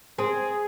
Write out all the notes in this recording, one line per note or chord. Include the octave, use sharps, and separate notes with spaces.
C4 G#4